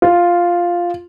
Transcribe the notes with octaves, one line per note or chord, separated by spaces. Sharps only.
F4